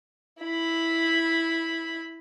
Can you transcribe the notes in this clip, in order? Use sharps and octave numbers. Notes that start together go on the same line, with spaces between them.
E4 B5